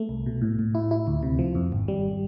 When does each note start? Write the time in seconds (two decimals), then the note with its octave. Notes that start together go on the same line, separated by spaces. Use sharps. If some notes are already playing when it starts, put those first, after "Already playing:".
Already playing: A3
0.09 C2
0.26 B2
0.42 A2
0.59 A2
0.75 E4
0.91 E4
1.07 D2
1.23 C3
1.39 F3
1.55 F2
1.72 G#1
1.88 G3